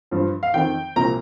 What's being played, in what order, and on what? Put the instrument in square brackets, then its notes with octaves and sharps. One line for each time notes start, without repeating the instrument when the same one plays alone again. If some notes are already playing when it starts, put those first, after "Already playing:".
[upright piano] G2 F3
F5
F2 D#3 G5
C2 A#2 F3 A#5